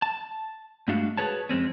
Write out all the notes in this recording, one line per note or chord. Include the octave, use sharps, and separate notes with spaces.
A5
G2 G#3 A3 D4 F#4 F5
F#4 G#4 B4 C#5 A5
F2 G#3 C4 C#4